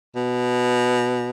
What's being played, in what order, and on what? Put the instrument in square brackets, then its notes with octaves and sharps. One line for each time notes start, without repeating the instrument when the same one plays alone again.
[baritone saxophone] B2